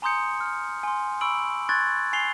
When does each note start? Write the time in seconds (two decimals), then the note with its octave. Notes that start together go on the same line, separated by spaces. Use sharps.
0.02 G#5 A#5 C6 D#6 G6 C#7
0.40 F6
0.83 G#5 C6
1.21 B5 C#6 E6 D7 F#7
1.69 C6 C#6 F#6 G#6 A6
2.13 G#5 C7 F7 G7